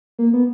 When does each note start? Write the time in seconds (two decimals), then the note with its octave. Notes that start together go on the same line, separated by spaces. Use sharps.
0.19 A#3
0.33 B3